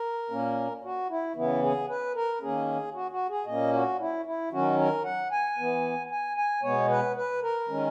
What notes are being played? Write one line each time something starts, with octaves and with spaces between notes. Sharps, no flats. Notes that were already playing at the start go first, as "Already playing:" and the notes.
Already playing: A#4
A#2 A#3 C#4
F#4
E4
C#3 E3 B3 E4
G#4
B4
A#4
D#3 A#3 C#4 G#4
F#4
F#4
G#4
A#2 A#3 C#4 D#5
F#4
E4
E4
D#3 F#3 C#4 F#4
A#4
F#5
G#5
E3 B3
G#5
G#5
B2 G#3 B3 C#5
B4
B4
A#4
D#3 G#3 C#4